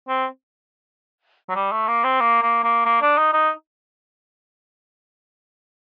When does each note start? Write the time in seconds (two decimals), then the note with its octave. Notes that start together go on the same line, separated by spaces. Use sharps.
0.09 C4
1.49 F#3
1.55 G3
1.72 A3
1.88 A#3
2.04 C4
2.20 A#3
2.42 A#3
2.64 A#3
2.85 A#3
3.02 D4
3.18 D#4
3.33 D#4